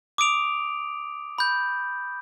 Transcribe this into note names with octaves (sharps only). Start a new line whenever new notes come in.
D6 D#6 D7 F7
B5 G6